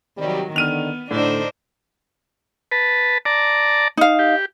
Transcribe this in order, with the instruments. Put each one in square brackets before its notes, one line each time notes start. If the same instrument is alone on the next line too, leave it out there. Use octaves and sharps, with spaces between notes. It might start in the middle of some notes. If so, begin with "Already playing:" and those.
[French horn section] C3 G3 [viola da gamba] D#3 F#3
[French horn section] D3 D#3 [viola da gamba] B3 [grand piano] F6 D#7 F7
[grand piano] A2 [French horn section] D3 [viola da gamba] D4 D#4 C5
[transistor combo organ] B4 A5
D5 A5 A#5
[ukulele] D#4 F5
[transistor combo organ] G4